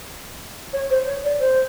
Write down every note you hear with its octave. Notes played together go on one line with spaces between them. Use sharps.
C#5
C5
C#5
D5
C5